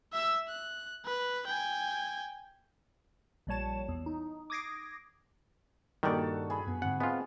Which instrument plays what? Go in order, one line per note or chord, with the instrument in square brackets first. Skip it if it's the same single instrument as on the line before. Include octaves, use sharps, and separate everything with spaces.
[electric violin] E5 E6
F#6
B4
G5 G#5
[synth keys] A#1 A#2 G3 C#5 A5 E7
E2
D#4
D6 D#6 G#6 A#6 C7 D7
[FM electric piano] G2 A#2 [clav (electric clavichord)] D#3 G3 D5 [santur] F#4 A4
[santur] G#4 B5
[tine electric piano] F#2 B3
[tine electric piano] G#2 D3 C4 [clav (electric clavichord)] F#5
[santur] G#3 [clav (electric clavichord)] B3 F4 [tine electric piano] C4